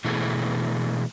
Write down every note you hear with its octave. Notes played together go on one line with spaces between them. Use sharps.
B2 E3 A3 G#4